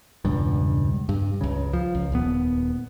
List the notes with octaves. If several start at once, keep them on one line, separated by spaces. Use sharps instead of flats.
E1 C#2 G2
G2
C#2 C#3
F3
C#2
D#1 B3